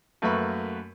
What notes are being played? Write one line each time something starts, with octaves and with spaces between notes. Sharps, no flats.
F#2 A3 A#3 B4 B5 C#6